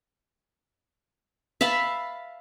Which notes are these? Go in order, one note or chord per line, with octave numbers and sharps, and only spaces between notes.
E5 F5 A5 B5